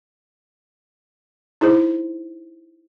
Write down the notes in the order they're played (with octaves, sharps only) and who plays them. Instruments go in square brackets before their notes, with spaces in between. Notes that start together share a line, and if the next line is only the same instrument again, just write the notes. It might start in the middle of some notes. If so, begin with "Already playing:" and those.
[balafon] D#4 E4 G#4 C5